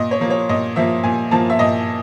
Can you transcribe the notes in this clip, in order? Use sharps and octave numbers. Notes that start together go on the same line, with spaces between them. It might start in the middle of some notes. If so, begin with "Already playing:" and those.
Already playing: A#2 D#5
C#5
F3 A#3
C#5
A#2 D#5
F3 A#3 E5
A#2 G#5
F3 A#3 A5
E5
A#2 D#5